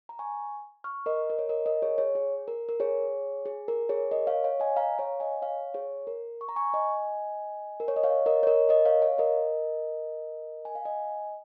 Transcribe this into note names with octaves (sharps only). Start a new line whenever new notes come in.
A#5
G#5 C#6
C#6 F6
A#4 D#5
A#4
C#5
A#4 D#5
A#4 D#5
G#4 C#5
G#4 C#5
G#4
A#4
A#4
G#4 C#5
G#4
A#4
G#4 C#5
A#4 D#5
C#5 F5
C#5 F5
D#5 G#5
F5 A#5
C#5 F5
D#5 G#5
C#5 F5
G#4 C#5
A#4
C#6
A#5
G#5 C#6
D#5 G#5
A#4
C#5
D#5
C#5 F5
A#4 D#5
C#5
A#4 D#5
A#4 D#5
C#5 F5
C#5 F5
A#4 D#5
G#5
F5
D#5 G#5